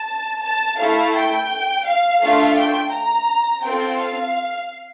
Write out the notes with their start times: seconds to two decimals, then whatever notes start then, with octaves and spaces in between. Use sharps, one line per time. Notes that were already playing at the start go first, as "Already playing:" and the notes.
Already playing: A5
0.44 A5
0.79 A3 E4 A4 F5
1.15 G5
1.87 F5
2.22 A3 D4 F4 A4
2.57 G5
2.93 A#5
3.64 C4 F4 A4 G5
4.00 F5